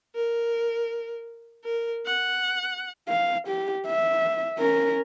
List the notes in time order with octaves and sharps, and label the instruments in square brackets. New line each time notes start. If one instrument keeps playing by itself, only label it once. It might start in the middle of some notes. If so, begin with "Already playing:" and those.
[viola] A#4
A#4
F#5
[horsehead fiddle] F5
G4
E5
C#4 A#4